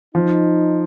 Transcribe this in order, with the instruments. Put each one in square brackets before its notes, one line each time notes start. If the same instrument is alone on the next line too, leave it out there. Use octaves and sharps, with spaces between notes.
[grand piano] F3 [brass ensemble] D#4